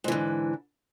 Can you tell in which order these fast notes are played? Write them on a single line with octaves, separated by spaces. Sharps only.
G#2 E3 D3